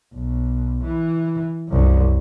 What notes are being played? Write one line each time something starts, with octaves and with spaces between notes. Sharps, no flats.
B1
E3
C2 F#2